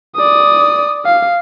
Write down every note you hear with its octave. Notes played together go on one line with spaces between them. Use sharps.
D5 D#6
F5